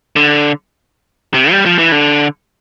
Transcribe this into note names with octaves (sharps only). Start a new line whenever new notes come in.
D3
C3
G3
F3
E3
D3